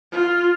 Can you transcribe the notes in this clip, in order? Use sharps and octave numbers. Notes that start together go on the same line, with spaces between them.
F4